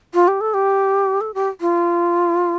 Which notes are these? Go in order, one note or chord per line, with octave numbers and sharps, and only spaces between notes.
F4
G4
A4
G4
A4
G4
F4